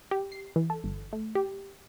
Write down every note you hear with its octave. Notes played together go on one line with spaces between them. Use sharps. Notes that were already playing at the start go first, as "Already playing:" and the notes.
G4
C7
E3
A4
G1
A3
G4